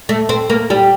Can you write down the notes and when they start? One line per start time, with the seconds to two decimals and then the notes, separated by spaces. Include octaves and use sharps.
0.09 A3
0.29 C4
0.50 A#3
0.70 G3